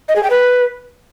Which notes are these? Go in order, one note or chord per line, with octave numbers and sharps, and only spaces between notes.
D#5
G#4
G5
B4